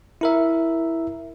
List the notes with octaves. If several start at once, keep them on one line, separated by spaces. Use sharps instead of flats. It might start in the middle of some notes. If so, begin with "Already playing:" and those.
E4 A#4 E5